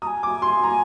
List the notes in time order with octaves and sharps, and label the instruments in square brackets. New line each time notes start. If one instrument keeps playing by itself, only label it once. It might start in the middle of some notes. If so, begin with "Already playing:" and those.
[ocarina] A#5 [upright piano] D#6
[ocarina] G#5
[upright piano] D6
C6
A#5